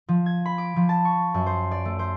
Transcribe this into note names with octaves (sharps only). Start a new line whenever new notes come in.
F3
G#6
B5
D6
F3
A5
C#6
F#2
C5
D5
A3
C5